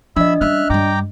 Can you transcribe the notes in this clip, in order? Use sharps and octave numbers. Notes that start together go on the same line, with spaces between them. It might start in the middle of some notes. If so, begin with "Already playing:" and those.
F3 D4 D#5 E5 B5 E6
G3 C#4 E5 F6 F#6
G2 G3 G5 A#5 D6